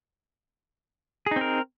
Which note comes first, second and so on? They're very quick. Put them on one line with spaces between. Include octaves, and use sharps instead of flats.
G#4 D#4 C4 A#4